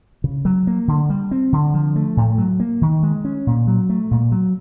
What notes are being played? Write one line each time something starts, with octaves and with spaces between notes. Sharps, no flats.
C#3
F#3
A#3
D3
G3
C4
D3
F3
A3
A2
F#3
A#3
D#3
G#3
C#4
A#2
F#3
A3
A#2
F#3